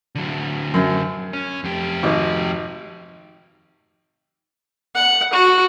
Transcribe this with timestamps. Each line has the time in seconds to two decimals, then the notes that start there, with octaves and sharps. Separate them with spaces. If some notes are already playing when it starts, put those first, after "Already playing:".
0.15 D3 F#3
0.74 F#2
1.33 C#4
1.64 F2 G4
2.03 G#1
4.95 F#5
5.33 F#4